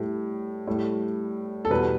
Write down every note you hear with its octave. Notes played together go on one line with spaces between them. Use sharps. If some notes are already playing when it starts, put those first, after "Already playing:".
Already playing: A2 G3
A2 G3
A4
E2 B2 G3 B4